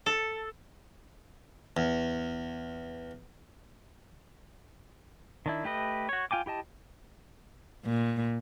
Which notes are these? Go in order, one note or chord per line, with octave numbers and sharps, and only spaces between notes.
A4
E2
D#3 D4 E4
A3 G4 B4 D#5
F#4 C#5
F4 G5 G#5 D6
E4 G4 D#5 A5
A#2